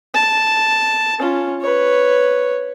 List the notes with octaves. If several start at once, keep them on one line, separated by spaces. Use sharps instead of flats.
A5
C#4 F4
B4 C#5